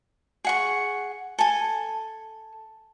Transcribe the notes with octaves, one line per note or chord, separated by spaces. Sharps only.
G#4 F#5 C#6
A4 G#5